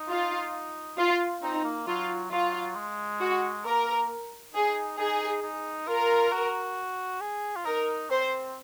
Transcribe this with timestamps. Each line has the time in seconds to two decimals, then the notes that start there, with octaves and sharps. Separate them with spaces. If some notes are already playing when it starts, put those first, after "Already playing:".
Already playing: D#4
0.09 F4
0.98 F4
1.42 C4 D#4
1.64 A#3
1.87 F#3 F4
2.31 F#3 F4
2.76 G#3
3.20 F#4
3.65 A#3 A#4
4.54 D#4 G#4
4.98 D#4 G#4
5.43 D#4
5.87 F4 A#4
6.33 F#4
7.21 G#4
7.56 F4
7.65 D#4 A#4
8.10 C4 C5